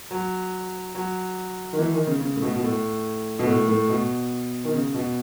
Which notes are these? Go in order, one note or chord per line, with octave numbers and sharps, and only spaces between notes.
F#3
F#3
D#3
E3
D#3
C#3
C#3
A2
B2
B2
A2
B2
A2
A2
B2
D#3
C#3
B2